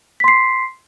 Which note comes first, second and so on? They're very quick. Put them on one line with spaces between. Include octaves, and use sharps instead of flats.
B6 C6 C7